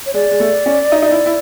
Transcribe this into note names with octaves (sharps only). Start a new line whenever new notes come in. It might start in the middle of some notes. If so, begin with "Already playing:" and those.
C#5
G#3 D5
G#3
A3
C#4
D#4
D#4
E4
E4